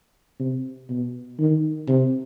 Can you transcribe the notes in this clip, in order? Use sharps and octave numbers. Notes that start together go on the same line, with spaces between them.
C3
B2
D#3
C3